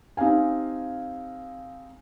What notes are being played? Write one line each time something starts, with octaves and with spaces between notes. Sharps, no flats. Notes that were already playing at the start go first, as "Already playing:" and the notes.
C4 D#4 G4 F5 G#5